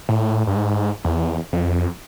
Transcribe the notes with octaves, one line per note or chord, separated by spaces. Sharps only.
A2
G2
G#2
E2
F2